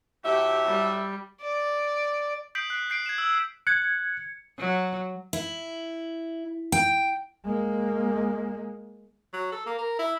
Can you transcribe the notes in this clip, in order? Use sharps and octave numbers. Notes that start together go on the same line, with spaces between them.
A2 F#3 G4 E5
G3
D5
D#6 G6 B6 C7 D7 F#7
F#6 C7 D7
G6 C7 D7
G#6 C7 E7
E6
F#6 G#6 C#7
F#3
E4
G5
G#3 A#3
F#3
A4
A#3
A#4
E4